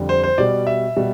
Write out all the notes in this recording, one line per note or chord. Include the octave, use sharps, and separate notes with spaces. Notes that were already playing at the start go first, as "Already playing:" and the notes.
Already playing: F2 D3 G3
C5
C5
B2 G3 D5
E5
B2 G3